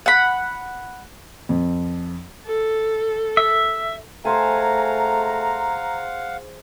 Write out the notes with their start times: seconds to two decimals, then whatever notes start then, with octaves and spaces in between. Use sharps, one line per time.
0.06 F#5 B5
1.49 F2
2.46 A4
3.37 E5
4.25 A3 G#4 C5 F5 F#5 G#5 A#5